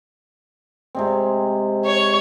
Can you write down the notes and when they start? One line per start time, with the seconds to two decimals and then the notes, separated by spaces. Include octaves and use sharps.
0.95 C3 G#3 C4
1.85 C#5